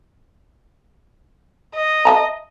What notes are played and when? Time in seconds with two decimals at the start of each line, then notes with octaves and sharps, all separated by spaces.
1.75 D#5
2.05 E5 A5 A#5